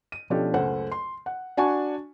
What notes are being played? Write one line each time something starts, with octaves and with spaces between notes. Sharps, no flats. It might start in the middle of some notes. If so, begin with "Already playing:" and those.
D#7
B2 F3 C#4 D4 G4 A4
C#2 F#2 A3 C5 F#5
C6
F#5
D4 F#4 G#5 A5 C#6